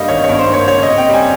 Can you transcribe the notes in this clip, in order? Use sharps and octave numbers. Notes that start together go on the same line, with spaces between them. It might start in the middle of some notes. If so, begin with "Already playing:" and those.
Already playing: G2 G3 A#3 D#5 F5
G#1 C#5
G2 C#5
C5
A#3
C#5
C#3 C#5
D#5
C4
G5
G3 G#5